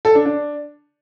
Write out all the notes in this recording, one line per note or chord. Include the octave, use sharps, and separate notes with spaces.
A4
D4
D4